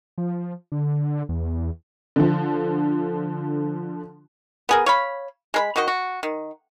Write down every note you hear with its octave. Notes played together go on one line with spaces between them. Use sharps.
F3
D3
E2
D3 F3
B3 G#4 A#4
C#5 F5 B5
G#3 A#4 B5
D#3 D#4 F#4 D#5
F#4
D#3